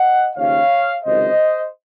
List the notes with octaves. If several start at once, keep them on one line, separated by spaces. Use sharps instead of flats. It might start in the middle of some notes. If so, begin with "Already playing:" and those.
Already playing: D#5 F#5
D#2 C#3 F3 C#5 F5
C#2 C3 D#3 F#3 C5 D#5